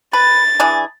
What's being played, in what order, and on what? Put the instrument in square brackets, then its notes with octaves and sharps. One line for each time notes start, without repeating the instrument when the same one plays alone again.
[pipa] B4 [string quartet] A6
[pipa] E3 D4 G#4